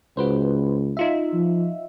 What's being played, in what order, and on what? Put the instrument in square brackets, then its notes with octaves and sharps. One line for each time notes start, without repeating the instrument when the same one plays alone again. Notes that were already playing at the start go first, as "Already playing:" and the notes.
[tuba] C#2 [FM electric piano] F#4 B4 C5
[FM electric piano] D#4 F4 E5
[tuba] F3